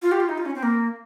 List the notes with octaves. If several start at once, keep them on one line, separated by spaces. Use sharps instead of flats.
F4
G4
F4
D#4
F4
C#4
C4
A#3